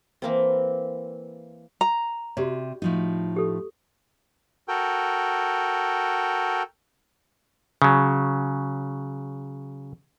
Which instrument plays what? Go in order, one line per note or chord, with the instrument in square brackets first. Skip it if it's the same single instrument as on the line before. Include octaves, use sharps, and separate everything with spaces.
[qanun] E3 A#3 C4
[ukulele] A#5
[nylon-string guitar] C3 [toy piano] F#4 G4 D5
[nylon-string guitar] A2 F3 D#4
[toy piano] G4 A4
[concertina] F#4 A4 A#4 G5
[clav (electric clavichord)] C#3 F#3